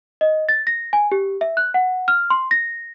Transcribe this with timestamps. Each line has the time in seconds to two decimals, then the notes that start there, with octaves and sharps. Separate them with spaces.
0.21 D#5
0.49 A6
0.67 A#6
0.93 G#5
1.12 G4
1.41 E5
1.57 F#6
1.74 F#5
2.08 F6
2.30 C6
2.51 A#6